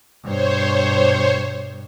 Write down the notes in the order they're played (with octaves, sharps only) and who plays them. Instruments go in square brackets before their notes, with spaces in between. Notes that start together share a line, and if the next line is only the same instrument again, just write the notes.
[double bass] G2 B2 [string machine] C5 C#5